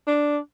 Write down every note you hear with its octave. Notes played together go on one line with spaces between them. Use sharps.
D4